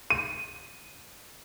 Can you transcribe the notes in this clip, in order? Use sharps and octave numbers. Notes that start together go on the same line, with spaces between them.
D#7